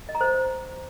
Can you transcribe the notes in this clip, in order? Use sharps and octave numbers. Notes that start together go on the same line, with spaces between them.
D#5
A#5
C5